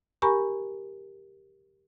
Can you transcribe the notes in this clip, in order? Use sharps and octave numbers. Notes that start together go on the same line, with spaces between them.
G4 A#4 G#5 A#5 B5 C#6